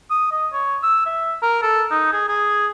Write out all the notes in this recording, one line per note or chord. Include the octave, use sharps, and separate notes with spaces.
D#6
D#5
C#5
E6
E5
A#4
A4
D#4
G#4
G#4